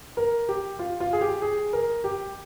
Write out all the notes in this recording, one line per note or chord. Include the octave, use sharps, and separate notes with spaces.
A#4
G4
F4
F4
G#4
G4
G#4
A#4
G4